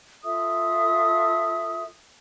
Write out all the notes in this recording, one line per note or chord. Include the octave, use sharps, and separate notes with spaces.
F4 A4 E5 D#6